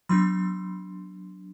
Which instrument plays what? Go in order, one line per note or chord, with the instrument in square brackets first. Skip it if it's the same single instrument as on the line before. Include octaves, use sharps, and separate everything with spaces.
[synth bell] F#3 B3 D4 C6